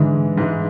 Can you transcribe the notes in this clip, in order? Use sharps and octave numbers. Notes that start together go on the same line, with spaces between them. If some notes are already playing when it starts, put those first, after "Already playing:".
Already playing: G#2 D3 E3 G#3
G#2 E3 G#3